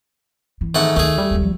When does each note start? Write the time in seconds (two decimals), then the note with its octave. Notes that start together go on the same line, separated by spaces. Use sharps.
0.61 E3
0.75 G#2 D#3 A3 F#5
0.96 D2 D#3 A3 G#4
1.18 G3
1.31 D1 D#2
1.43 F3